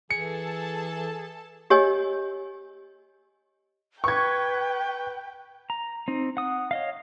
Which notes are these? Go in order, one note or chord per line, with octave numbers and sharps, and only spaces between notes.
E3 G#4 A4 A5 C#7
G4 C#5 D#5 G#5
B4 G5 C#6 G#6
A#5
C4 D#4
F#5 D#6
C#5 D#5 F5